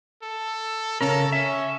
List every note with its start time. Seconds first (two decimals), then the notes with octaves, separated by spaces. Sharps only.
0.23 A4
1.01 C#3 C#4 A4 A#4
1.33 C#4 E5